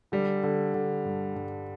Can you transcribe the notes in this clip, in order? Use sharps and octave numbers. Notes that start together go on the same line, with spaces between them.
D3 G3
D3
D3
G2
G2